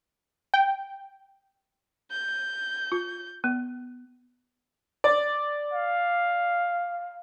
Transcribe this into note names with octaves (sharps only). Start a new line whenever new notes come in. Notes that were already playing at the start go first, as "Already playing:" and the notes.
G5
G6
F4
B3
D5
F5